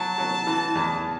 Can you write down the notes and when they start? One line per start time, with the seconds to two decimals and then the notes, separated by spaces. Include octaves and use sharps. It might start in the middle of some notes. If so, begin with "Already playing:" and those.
Already playing: F#3 A5
0.18 F#3
0.47 E3
0.75 E2